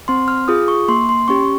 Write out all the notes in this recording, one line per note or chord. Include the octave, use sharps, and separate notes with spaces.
C4 C6
F6
F4 G#4 D#6
C#6
A#3 C6
C6
C#4 G4 C#6